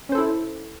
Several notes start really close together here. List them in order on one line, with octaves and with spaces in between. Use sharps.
C#4 C5 A4 E4